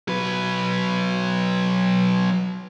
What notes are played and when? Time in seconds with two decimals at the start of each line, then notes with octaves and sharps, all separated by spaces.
0.08 F#3 B4